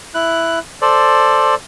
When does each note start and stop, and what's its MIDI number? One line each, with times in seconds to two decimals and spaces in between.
0.14 0.59 64
0.14 0.59 90
0.82 1.55 69
0.82 1.55 72
0.82 1.55 74